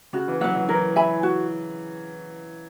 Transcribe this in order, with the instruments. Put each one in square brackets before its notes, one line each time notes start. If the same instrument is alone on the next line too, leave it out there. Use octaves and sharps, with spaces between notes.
[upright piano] C#3 [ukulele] F#4
[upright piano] E3
[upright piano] F#3 [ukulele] B4 F#5
[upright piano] F#3
[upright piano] E3 [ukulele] A#4
[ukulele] E5 G#5 B5
F#4